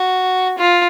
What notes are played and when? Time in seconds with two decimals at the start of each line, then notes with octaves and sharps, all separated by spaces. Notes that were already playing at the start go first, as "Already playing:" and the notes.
Already playing: F#4
0.58 F4